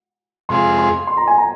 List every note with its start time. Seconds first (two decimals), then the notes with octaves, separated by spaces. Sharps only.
0.49 F2 C3 G#3 F4 G#4 C6
0.78 C6
1.07 C6
1.17 A#5
1.27 G#5
1.38 A#5